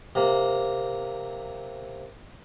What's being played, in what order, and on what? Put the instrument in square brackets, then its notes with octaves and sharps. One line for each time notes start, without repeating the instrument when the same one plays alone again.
[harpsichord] C3 A#3